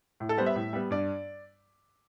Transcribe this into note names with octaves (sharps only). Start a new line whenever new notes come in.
A2
A4
G3 B3 C5
E5
A2
G3 B3
G2 D5